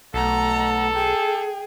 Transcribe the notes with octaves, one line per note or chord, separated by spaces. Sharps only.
B1 A3 A4 F#5 A#5
G#4 G5